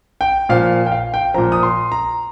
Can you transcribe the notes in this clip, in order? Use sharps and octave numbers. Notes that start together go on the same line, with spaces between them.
G5
A#2 F3 F5
G5
F5
G5
A#2 F3 A#5
D#6
C6
A#5